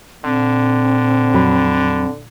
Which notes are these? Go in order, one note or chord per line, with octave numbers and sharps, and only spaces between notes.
A#2 D3 C4
F2 F#3 B5